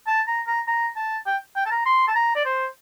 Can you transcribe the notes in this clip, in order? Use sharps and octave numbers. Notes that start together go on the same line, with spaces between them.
A5
A#5
A#5
A#5
A5
G5
G5
A5
A#5
C6
A5
A#5
D5
C5